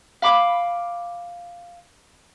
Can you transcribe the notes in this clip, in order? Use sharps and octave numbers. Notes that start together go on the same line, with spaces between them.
F5 B5 D6